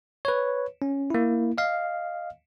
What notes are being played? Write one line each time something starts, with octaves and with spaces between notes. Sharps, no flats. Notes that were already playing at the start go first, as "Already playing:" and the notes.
B4 C#5
C#4
A#3 E4
D#5 F5